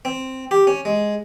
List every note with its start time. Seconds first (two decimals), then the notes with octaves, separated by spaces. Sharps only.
0.05 C4
0.51 G4
0.67 C#4
0.85 G#3